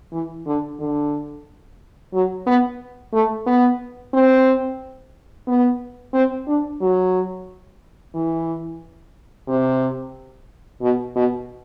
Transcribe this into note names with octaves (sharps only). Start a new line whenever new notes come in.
E3
D3
D3
F#3
B3
A3
B3
C4
B3
C4
D4
F#3
E3
C3
B2
B2